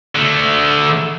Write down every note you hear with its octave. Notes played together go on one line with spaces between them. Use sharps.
D3 A3